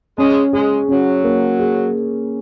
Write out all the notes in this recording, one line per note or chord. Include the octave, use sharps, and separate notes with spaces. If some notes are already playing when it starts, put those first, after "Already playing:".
G#3 C#4
G#3 G#4
F#3 C#4
A#3
G#4